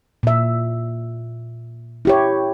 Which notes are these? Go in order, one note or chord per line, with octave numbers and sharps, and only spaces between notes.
A#2 E5
E4 G4 C#5